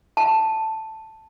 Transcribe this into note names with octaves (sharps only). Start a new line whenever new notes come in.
A5